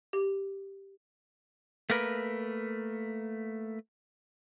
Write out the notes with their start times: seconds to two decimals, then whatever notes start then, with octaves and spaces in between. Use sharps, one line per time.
0.13 G4
1.90 A3 A#3 A#4 B4